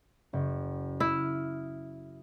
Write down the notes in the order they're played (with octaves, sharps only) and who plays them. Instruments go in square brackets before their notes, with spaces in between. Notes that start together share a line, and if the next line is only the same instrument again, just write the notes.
[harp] F#1
[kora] E4 [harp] D#6 F6